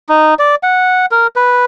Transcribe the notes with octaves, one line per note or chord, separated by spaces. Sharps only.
D#4
D5
F#5
A#4
B4